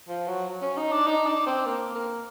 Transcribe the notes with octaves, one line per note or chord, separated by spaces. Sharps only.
F3
F#3
C#4
D#4
D4
D#4
D4
C4
A#3
A#3